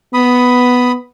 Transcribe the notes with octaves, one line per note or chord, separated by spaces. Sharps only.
B3 B5 D#6